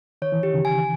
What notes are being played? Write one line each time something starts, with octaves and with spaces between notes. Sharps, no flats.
D#3 C#5
E3
D#3 G4
C#3
G#5